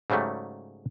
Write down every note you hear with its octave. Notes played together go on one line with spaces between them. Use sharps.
G#2 C#3 F#3 G3 A3